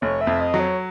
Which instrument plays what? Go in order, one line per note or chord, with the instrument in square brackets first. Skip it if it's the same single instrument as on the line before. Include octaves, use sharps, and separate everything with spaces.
[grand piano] F1 [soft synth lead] C#5
[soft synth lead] E5
[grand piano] F2
[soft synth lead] D#5
[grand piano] F#3
[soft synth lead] C#5